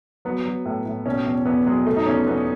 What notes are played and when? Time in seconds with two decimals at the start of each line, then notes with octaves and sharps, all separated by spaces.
0.25 F#3 B3
0.45 F#3
0.66 A2
0.86 A2
1.06 B2 C#4
1.26 E2
1.45 E2 B3
1.66 F#3 G#3
1.86 B2 A3
1.96 D#4
2.06 E2 C#4
2.27 E2 B3